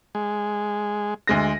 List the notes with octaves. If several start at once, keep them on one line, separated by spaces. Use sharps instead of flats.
G#3
D2 G#3 A#6